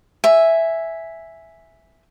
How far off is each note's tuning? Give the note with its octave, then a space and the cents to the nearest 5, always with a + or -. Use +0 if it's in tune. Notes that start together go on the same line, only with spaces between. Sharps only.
E5 +0 G#5 +0